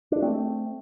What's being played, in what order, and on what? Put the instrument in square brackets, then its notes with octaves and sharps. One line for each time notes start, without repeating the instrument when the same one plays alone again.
[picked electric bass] D4
A3 C4